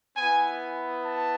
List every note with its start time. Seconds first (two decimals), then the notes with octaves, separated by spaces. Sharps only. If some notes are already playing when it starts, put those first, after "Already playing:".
0.17 B3 E4 G#5
1.04 A5